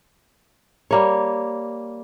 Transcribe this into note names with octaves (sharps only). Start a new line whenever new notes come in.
G3 A#3 C#5